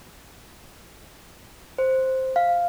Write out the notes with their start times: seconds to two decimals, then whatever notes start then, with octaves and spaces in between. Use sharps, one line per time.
1.78 C5
2.36 F5